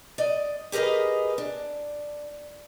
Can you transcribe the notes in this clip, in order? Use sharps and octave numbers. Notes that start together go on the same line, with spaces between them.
D5 D#5
G4 G#4 A#4 B4 D#5
D4